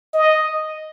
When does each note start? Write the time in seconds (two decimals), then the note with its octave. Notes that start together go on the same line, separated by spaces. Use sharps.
0.13 D#5